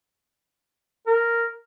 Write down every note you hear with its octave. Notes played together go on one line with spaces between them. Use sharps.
A#4